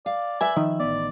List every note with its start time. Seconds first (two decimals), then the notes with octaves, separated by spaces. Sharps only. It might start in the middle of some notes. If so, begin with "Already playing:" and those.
0.06 D5 F5
0.41 B4 E5 G#5
0.57 D#3 F3
0.80 A1 B3 D5